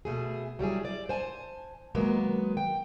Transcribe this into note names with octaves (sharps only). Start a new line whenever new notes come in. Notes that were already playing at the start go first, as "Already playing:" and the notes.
B2 A3 G#4
F#3 G3 E4 G#4
D5
C5 G#5 A5
D#3 F#3 G#3 A#3 B3
G5